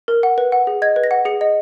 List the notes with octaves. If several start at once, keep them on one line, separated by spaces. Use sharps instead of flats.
A#4
F#5
B4
F#5
G#4
D#5 G#6
B4
A#6
F#5
G#4 C#7
D#5